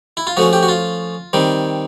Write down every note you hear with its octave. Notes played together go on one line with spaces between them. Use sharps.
E4
F4
F3 A3 C#4 F#4
G4
F#4
F4
D#3 G3 C4